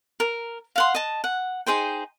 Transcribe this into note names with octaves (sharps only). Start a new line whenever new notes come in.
A#4
F5 F#5 C6
D#5 A5
F#5
D#4 G#4 C5 G5